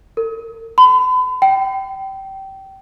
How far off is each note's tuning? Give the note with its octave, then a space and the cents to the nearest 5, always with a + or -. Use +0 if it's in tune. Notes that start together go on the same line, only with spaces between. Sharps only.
A#4 -40
B5 +40
G5 -20